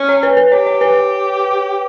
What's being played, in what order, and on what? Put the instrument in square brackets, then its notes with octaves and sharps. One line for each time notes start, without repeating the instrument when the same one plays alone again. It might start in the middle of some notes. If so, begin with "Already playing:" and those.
Already playing: [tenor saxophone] C#4
[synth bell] C#5
B4
B4
[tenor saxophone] G4 [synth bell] C#5
[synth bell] C#5
B4